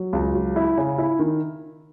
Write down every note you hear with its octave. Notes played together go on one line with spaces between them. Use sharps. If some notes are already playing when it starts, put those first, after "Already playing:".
Already playing: F#3
C#2
F#3
E4
C#3
E4
D#3